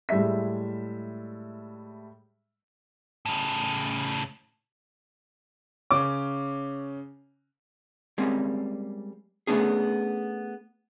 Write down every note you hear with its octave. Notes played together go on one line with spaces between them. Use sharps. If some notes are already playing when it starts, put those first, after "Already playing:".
A2 G3 G#3 E5 B6
A2 C#3
C#3 C#4 D6
G3 G#3 A#3 C4 C#4
A3 B3 C#4 D4 G#4